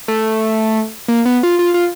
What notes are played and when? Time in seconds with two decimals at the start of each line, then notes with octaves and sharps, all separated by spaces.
0.08 A3
1.08 A#3
1.26 B3
1.43 F4
1.59 F4
1.74 F4